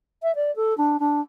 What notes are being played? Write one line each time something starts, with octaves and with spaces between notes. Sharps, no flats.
E5
D5
A4
D4
D4